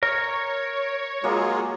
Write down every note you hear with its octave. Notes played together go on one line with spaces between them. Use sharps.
A#4 C#5
F#3 G#3 A#3 F4 G#4